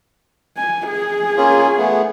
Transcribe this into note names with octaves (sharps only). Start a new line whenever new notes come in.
G#5
G#4
A#3 C#4 F4
A3 B3